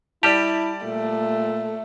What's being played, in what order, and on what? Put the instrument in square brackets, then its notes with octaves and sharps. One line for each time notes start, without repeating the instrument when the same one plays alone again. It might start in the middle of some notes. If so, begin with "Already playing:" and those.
[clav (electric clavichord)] G3 G4 [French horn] E4 [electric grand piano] D5 A5
[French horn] A#2 [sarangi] A3